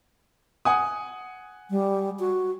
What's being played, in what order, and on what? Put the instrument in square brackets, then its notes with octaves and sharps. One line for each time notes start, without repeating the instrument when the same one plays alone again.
[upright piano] F#5 G#5 D#6
[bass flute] G3
F#4